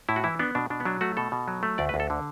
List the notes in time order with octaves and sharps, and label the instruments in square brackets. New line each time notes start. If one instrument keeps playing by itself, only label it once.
[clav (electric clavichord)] A2 E4
F#4
E3 E4
B3 D4
B2 D4
B2 D4
B3
F#3 D4
A3 F#4
B2 A4
B2
F#3
A3
D2 D5
B4
D2
A4
D3